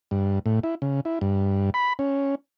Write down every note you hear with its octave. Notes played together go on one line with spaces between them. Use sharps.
G2
A2
E4
C#3
E4
G2
B5
C#4